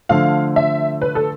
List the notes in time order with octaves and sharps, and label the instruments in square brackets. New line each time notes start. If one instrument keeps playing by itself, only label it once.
[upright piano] D3 F3 A3 [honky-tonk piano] F5
[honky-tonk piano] E5
B4
A4